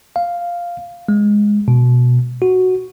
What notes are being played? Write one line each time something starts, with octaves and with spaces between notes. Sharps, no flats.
F5
G#3
B2
F#4